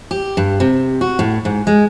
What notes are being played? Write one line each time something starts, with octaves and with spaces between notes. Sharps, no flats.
G4
G2
C3
F#4
A2
G#2
G#3